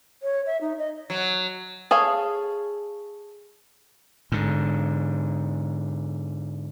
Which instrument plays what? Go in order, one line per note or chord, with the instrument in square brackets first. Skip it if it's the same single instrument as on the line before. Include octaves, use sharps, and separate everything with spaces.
[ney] C#5
E5
D#4
D#5
[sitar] F#3
[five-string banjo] G#4 A4 C#5 F5
[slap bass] G#2 D3